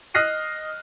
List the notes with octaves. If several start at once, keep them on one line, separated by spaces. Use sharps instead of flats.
D#5 F6 F#6 A#6 C7 D#7